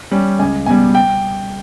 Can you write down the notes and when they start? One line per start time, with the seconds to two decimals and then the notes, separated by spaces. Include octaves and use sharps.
0.11 G3 C#4
0.39 C#2 G#5
0.66 B2 G3 G#5
0.95 G5